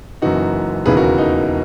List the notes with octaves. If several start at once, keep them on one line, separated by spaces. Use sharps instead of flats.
F#1 F#2 E3 D#4 F#4
E1 D#2 C#3 E3 G#4 B4
F#4 A#4
D#4